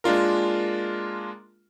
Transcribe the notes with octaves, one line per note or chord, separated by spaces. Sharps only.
G#3 A#3 D4 F4 A#4